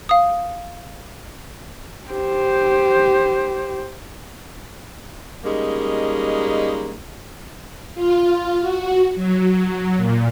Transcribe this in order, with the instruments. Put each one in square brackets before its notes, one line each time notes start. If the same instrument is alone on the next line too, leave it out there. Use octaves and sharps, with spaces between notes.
[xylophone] F5 D#6
[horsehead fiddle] G4 C5
[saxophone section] G3 G#3 A#3 C#4 D#4
[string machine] F4
F#4
F#3
A#2